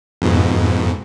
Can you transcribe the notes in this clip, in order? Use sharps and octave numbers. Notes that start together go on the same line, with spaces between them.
F2 G#2 B2